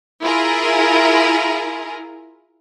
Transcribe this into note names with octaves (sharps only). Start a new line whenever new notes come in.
E4 F4 G#4 A#4